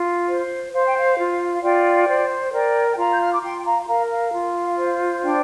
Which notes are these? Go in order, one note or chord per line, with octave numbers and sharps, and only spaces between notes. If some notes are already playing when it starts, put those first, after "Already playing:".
Already playing: F4
C5
C5 F5
G5
F5
F4
F5
F4 D5 G5
C5
A#4 D5 G5
G5
F4 F5 A#5
G6
F6
D6
F4 G5 C6
G5
F5 A#5
C6
A#4 F5 A#5
F5
F4
C5
D4 D5 G5